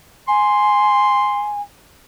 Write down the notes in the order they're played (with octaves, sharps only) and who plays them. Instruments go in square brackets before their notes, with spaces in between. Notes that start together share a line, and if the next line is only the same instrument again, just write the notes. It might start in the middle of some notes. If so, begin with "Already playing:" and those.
[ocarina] G#5 [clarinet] C6